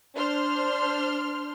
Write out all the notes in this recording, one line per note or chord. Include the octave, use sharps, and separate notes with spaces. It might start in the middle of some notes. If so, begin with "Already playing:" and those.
D4 C5 C6 F6